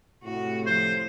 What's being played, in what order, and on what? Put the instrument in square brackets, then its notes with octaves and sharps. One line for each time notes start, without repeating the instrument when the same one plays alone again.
[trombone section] A2 C3 [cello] F#4
[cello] F3 [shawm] C5